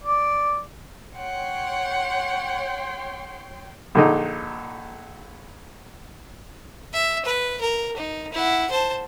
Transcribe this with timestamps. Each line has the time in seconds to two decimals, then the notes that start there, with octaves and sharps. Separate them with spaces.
0.03 D5
1.16 C#5 F#5 G5 C6
3.95 A#1 D3 D#4
6.93 E5
7.25 B4
7.61 A#4
7.96 D#4
8.32 E4 F#5
8.70 C5 A5